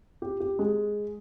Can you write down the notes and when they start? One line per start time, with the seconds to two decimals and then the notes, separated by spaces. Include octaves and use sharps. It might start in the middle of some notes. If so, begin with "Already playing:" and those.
0.22 G4
0.40 G4
0.59 G#3